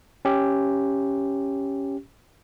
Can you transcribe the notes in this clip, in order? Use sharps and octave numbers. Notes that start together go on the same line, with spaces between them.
C#4 G4